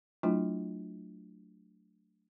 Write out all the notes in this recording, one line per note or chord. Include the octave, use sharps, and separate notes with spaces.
F#3 A3 D4 E4 F4